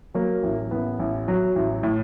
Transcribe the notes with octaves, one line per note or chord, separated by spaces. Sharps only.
F#3 A#3
A1
A1 B3
A1
F#3
A1
A2